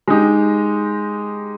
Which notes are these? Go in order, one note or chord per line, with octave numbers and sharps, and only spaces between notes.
G#3 D#4 G4